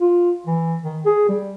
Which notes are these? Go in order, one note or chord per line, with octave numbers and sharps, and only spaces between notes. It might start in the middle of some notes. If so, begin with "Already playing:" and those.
F4
E3
D#3
G#4
G3